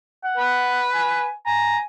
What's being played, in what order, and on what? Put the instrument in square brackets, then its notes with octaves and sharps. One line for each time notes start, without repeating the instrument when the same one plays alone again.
[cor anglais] F#5
[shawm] B4
[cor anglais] G#5
[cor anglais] G#5 [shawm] A#5